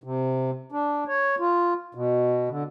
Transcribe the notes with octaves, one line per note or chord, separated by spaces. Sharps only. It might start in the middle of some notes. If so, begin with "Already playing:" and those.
C3
D4
C#5
F4
B2
D3